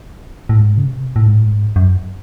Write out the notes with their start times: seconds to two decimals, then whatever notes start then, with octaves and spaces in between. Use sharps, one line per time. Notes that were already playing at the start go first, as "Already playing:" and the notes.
0.49 A2
0.57 G#2
0.78 C#3
0.86 C3
1.16 A2
1.26 G#2
1.35 A2
1.45 G#2
1.76 F#2